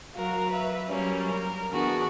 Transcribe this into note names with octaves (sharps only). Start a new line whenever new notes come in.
F#3 F#4 A#4 F5
B4 E5
F#3 G3 A#3 C#4
A#4
E3 B3 D4 F#4 G#4